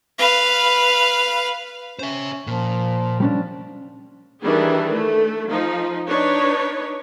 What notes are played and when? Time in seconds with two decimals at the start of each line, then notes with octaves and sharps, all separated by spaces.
0.18 B4 F5
1.99 C#4 C5 E5
2.47 A#2 F3
3.20 F3 G3 C#4 D4
4.41 D#3 E3 G3 D4 G#4
4.91 A3
5.49 F3 D#4
6.06 D4 D#4 B4 C#5